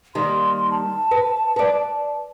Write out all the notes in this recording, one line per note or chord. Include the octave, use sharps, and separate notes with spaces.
D#3 G3 A#3 C6
A5
B4
B4 D5